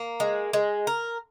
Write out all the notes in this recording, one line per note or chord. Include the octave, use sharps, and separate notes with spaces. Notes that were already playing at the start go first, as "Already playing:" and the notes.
Already playing: A#3
G#3
G#3
A#4